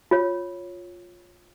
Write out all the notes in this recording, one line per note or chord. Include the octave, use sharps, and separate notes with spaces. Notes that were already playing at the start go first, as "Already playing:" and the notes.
F4 C#5